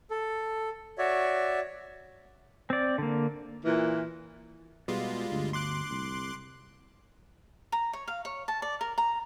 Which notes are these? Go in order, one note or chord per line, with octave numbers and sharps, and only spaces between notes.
A4
F#4 C#5 D5 E5
C4 D5
D3 A#3
A#2 E3
B2 G3 G#3 F4
G1 D2
C6 D6 F#6
C2
A#5
C#5
F5
C#5
A5
D5
A#4
A#5